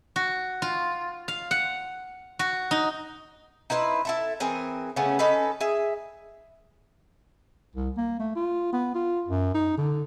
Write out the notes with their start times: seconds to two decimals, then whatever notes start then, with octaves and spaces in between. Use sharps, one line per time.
0.16 F#4
0.62 F4
1.28 F5
1.51 F#5
2.39 F#4
2.71 D#4
3.70 D#4 E4 B4 C5
4.05 E4 A4 E5
4.40 E3 C4 G#4 A#4
4.96 C#3 A3 B3 C#4
5.19 C#4 D#4 A4 B4
5.60 G#4 E5
7.76 C2
7.97 A#3
8.20 A3
8.36 F4
8.73 B3
8.95 F4
9.29 F#2
9.54 D#4
9.78 D3